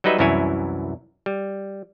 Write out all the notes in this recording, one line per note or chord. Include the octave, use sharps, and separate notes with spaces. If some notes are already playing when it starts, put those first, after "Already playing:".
F#3 G3 D#4 B4 D#5 E5
C2 F#2 E3 E4 C#5 G#5
G3